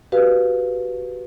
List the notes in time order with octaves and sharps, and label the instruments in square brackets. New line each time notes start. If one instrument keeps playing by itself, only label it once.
[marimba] F#4 G4 B4 F5